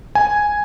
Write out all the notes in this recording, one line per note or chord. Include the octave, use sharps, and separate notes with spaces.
G#5